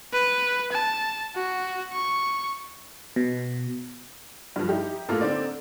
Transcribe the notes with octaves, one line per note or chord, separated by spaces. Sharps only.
B4
A5
F#4
C#6
B2
G2 F3
D#4 E4 G4
A2 A#3 F4 A4
D3 C4 D#4 D5